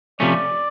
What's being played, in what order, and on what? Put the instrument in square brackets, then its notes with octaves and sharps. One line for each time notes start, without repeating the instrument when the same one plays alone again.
[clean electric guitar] C3 F3 A3 C#4 [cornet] D5